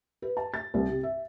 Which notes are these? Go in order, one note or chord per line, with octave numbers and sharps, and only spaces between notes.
B4
A5
A6
C2
C3
E5